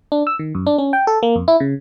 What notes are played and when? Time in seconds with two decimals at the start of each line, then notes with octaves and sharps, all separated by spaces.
0.12 D4
0.27 E6
0.39 D#3
0.55 F#2
0.67 D4
0.78 C#4
0.93 G5
1.07 A4
1.23 A#3
1.36 F2
1.48 E4
1.60 C#3